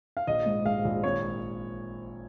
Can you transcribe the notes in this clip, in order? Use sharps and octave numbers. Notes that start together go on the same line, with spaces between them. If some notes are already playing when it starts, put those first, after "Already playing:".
F5
A#1 D#5
G#2
G#2 F5
A#1
G#1 C#5